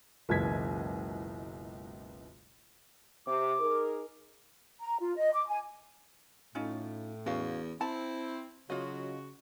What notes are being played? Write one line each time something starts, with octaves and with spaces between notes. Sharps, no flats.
F#1 C#2 B2 E3 G#6 B6
C3 D6
D#4 G#4 A#4
A#5
F4
D#5
D6
G#5
A2 C#4 D#4 F4
E2 C#4 F#4 F5
C4 E4 A5
C#3 F#3 F4 F#4 D#5